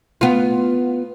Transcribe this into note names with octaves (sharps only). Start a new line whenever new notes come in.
B3 F4